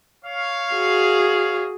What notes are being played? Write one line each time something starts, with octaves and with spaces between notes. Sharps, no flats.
C#5 F5
F#4 G#4